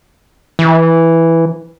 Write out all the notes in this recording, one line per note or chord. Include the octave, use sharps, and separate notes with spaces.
E3